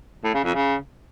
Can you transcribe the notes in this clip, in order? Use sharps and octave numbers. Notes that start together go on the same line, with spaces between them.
A2
C#3
F2
C#3